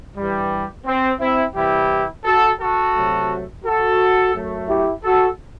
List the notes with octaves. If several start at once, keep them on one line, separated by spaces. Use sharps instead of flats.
G2 E3 G3
C4
C4 E4
C3 E3 G3 E4 G4
F#4 A4
F#4 A4
C3 F#3 A3
F#4 A4
F#2 F#3 A3
E4 G4
F#4 A4